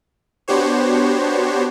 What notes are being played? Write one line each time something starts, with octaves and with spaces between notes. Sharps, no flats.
B3 D4 F#4 G4 C5 C#5